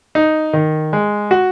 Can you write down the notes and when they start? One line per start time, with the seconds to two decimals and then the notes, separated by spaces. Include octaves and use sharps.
0.15 D#4
0.53 D#3
0.93 G#3
1.31 F#4